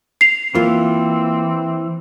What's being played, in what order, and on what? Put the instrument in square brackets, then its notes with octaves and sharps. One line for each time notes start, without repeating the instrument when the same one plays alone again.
[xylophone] C7 F7
[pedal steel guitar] E3 [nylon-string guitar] A#3 F4 [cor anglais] C4